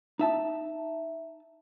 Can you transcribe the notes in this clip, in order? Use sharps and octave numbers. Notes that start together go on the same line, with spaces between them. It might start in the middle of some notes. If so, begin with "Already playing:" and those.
D#4 E5 A5